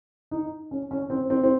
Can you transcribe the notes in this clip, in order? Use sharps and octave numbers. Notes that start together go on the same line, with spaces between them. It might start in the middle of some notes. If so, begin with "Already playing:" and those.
D#4
C#4
C#4
C4
C4
C4